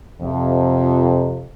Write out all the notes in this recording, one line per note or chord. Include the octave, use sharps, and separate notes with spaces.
F2 C3